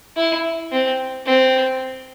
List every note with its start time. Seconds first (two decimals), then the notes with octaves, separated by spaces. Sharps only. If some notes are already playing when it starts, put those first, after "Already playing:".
0.17 E4
0.72 C4
1.26 C4